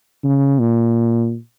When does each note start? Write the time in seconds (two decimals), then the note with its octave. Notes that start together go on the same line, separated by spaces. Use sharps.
0.24 C#3
0.60 A#2